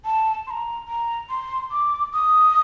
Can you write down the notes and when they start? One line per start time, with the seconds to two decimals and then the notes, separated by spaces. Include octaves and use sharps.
0.05 A5
0.47 C6
0.51 A#5
0.88 A#5
1.30 C6
1.71 D6
2.14 D#6